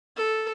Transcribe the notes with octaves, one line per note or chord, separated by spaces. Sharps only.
A4